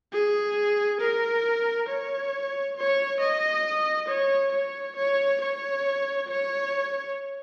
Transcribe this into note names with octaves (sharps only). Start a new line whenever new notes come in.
G#4
A#4
C#5
C#5
D#5
C#5
C#5
C#5
C#5
C#5